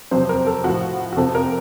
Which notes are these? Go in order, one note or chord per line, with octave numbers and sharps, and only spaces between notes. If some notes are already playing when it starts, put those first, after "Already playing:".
F2 C3 F#3 C5
A#4
A4
A2 F3 F#4
F#4
F2 C3 F3 A4
A#4